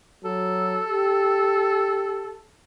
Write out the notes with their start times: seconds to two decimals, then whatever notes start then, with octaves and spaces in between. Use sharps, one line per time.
0.24 F#3 A4
0.87 G4